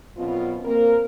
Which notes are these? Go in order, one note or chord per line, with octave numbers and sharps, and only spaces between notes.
F#2 B2 B3 C4 F4
A#3 C4 A#4